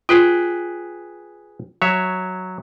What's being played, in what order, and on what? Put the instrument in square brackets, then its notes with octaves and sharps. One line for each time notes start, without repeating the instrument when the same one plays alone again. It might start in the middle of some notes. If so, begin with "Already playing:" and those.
[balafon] F4 [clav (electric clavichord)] G#4 B4 G5
[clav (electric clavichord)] F#3 C#5 E5